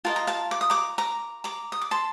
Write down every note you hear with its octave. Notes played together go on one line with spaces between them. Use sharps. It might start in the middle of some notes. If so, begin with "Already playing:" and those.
F4 A#4 D#5 A5
A#5
F5 A5
D6
D#6
A#5 D6
A#5 D6
A#5 D6
D#6
D6
A5 C6